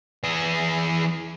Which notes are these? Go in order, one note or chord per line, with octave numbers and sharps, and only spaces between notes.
E3 G#4